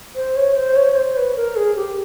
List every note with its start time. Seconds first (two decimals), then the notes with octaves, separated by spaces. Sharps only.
0.16 C5
0.36 C#5
0.56 C5
0.76 C#5
0.96 C5
1.17 B4
1.37 A#4
1.56 G#4
1.76 G4